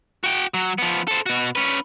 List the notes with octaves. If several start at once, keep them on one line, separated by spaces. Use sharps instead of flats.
F#4 G5
F#3
F3 B3
A4 C5
B2 F#4
C#4 B4